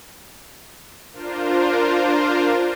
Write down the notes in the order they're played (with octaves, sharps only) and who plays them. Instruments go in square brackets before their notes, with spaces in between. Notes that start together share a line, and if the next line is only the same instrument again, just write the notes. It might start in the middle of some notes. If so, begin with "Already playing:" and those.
[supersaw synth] D4 F4 A#4 C5